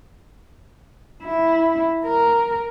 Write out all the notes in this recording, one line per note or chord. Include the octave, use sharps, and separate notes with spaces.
E4
A#4